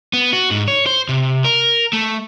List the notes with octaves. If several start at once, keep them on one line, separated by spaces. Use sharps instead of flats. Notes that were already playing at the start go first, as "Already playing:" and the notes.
B3
F#4
G#2
C#5
C5
C3
A#4
A3